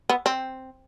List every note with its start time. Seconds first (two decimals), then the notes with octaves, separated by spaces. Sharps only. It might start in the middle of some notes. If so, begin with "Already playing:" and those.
0.09 B3
0.26 C4